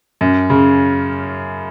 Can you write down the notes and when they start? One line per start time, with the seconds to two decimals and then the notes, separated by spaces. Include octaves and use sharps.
0.21 F#2
0.50 C#3